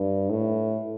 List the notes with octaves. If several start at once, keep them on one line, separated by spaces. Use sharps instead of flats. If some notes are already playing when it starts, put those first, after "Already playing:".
Already playing: G2
A2